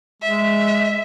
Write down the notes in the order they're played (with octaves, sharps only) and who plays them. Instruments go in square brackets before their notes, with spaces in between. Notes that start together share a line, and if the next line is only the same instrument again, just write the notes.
[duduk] G#3 [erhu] E5